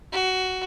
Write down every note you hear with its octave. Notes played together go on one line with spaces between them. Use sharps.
F#4